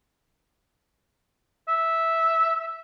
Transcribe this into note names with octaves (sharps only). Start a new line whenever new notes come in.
E5